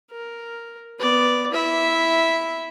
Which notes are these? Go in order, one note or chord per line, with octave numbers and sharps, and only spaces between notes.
A#4
B3 D5
E4 E5